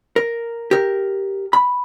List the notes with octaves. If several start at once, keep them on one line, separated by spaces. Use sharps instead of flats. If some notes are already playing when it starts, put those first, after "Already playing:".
A#4
G4 A#4
B5